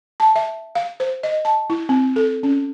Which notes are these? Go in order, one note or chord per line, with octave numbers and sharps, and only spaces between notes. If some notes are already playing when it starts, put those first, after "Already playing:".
A5
E5
F5
C5
D#5
A5
E4
C4
A4
C#4